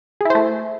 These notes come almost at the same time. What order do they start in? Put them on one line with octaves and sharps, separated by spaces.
G#4 E4 C5 A3